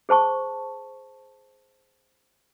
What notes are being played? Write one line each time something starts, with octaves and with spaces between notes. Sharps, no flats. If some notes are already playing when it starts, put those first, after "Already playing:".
G#4 C5 A5 C#6